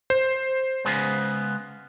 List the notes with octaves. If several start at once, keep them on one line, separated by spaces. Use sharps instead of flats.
C5
C#3 G#3 B3